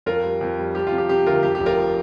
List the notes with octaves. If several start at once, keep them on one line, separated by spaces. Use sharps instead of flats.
F2 F4 A#4
G3
F2
G3
F3 G4
F4
C3
G4
C3 G4
D2 F4 A#4
F2 G4
G4
F1
F4 A#4
F3